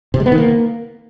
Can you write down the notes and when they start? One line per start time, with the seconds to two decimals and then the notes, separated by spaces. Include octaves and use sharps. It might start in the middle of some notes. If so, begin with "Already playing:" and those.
0.14 C3
0.20 G#3
0.26 B3
0.32 D#3
0.38 A#3